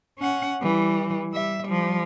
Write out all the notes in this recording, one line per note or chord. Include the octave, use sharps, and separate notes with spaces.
C#4 F#5
E3 G3
G3 E5
F3 G3